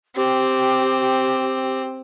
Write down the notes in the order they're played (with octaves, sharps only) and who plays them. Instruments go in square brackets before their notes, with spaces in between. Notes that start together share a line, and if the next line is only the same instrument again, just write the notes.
[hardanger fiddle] C4 [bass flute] G4